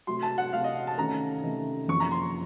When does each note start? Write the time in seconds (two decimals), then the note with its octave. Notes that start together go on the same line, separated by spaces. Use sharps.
0.07 C3 F#3 A3 C6
0.23 A5
0.38 F#5
0.53 C3 F#3 A3 F5
0.64 D#5
0.87 A5
0.98 C3 D#3 A3 C#4 A4 A#5
1.43 C3 D#3 A3 C#4 A4
1.88 F#1 F2 C3 F3 C#6
2.00 A#5
2.12 C6